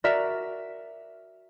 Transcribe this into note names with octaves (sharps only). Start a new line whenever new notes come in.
F#4 A#4 D5 E5